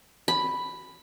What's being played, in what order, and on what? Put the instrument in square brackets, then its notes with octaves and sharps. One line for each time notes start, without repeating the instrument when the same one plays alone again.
[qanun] B5